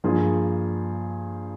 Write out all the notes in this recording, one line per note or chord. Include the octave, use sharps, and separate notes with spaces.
G2 F3 A#3 F4 G#4